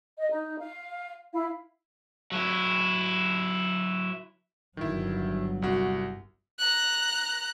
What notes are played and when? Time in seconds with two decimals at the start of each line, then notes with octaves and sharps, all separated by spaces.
0.18 D#5
0.31 D#4
0.59 F5
1.34 E4 F5
2.32 F#3 E4
4.77 G1 D#3 F#3 E4
5.62 C2 F#4
6.59 A#5 F#6